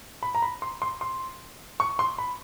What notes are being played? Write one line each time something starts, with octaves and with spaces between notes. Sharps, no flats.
B5
A#5
B5
C6
C6
C6
C#6
C6
B5